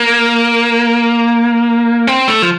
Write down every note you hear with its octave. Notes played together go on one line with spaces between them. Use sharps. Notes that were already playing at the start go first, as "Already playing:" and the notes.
Already playing: A#3
C4
A3
F3